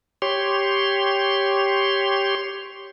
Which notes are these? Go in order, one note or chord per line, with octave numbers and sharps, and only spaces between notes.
G4 C#5 C6